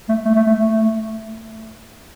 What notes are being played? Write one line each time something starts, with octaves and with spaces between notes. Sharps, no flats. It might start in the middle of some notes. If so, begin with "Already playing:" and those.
A3
A3
A3
A3
A3